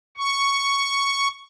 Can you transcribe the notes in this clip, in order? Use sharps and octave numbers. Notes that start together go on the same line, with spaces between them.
C#6